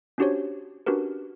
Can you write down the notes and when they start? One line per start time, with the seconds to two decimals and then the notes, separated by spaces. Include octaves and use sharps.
0.18 C#4 D4 F#4 G4 C5 C#5
0.86 C#4 D4 F#4 G4 A#4 B4